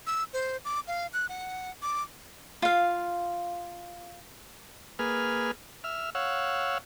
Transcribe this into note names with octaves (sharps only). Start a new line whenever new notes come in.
E6
C5
D6
F5
F#6
F#5
D6
F4 F5
A#3 G#4 B4 F6
E5 F6
C#5 F5 F#5 E6